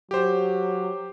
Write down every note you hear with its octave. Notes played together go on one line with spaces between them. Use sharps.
F#3 G4 C5